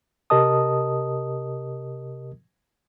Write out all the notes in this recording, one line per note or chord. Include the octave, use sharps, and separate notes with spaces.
C3 G4 A#4 D#5 A5 D#6